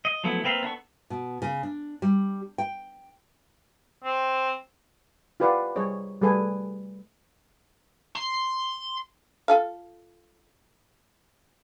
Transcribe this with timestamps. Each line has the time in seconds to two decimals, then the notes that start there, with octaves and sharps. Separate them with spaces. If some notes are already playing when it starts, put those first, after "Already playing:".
0.05 D#5
0.24 F3 F#3 A3 B3 E4
0.44 A#3 C4 B4 E5 F5
0.63 B3 D4 A4 C#6
1.10 B2
1.42 C#3
1.63 D4
2.02 G3
2.58 G5
4.04 C4
5.40 F4 G4 B4 D5 F5 F#5
5.76 G3 G#4 C5 C#5 D#5
6.22 G3 A3 G#4 A4 B4 G#5
8.15 C6
9.48 F4 A4 F5